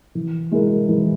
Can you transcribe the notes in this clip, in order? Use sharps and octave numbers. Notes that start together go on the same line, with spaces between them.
E3
G#3 E4 A#4
E3